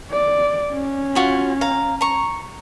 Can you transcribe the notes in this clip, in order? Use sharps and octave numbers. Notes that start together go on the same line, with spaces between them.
D5
C#4
F4 F#4 B5
F5 A#5
A#5 C#6